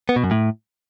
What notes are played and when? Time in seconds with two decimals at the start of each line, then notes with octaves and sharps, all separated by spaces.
0.09 B3
0.16 B2
0.24 F#2
0.31 A2